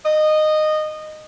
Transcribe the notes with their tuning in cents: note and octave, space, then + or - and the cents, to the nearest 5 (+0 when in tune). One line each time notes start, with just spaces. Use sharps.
D#5 -15